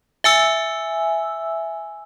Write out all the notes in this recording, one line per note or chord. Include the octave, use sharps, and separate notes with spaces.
E5 G#5 E6